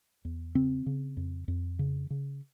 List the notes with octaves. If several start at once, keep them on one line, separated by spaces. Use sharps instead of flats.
E2
C#3 C4
C#3
F2
F2
C#3
C#3